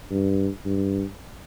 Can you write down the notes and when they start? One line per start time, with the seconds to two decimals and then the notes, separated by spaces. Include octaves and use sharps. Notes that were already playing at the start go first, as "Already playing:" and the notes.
0.11 G2
0.65 G2